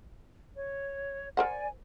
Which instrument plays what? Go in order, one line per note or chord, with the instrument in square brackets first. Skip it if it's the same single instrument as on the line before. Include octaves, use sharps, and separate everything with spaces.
[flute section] C#5
[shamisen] A#4 C5 F#5 [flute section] D5 G#5